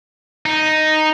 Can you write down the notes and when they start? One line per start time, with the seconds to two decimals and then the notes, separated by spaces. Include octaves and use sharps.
0.46 D#4